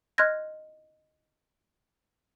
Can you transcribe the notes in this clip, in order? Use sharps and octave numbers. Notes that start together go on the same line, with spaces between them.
D#5 C6 F6 F#6 G#6 A#6